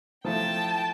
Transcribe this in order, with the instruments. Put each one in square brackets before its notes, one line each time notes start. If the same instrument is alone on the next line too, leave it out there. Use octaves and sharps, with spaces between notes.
[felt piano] F3 A3 E4 [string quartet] G5 A5